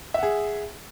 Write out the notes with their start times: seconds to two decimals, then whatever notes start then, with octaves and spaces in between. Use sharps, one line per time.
0.14 E5
0.19 F#5
0.23 G#4